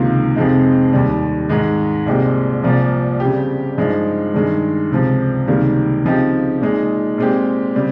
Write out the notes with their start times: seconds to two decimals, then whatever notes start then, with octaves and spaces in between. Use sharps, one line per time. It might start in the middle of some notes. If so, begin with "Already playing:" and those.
Already playing: C#2 C3 D#3 A#3 F4
0.36 F2 C3 F3 G#3 D#4
0.93 D#2 D#3 G3
1.49 G#2 D#3 G#3
2.06 C2 A#2 G#3 C4 G4
2.63 C2 A#2 F3
3.20 C#3 G3 C4 G4
3.78 G2 F3 G#3 D#4
4.34 G2 D#3 G#3
4.91 C#2 C3 F3
5.48 C#2 C3 D#3 G3 A#3
6.04 C#3 F3 C4 D#4 G4
6.61 A#2 G#3 D#4
7.18 A#2 G#3 C4 G4
7.75 C#3 G3 C4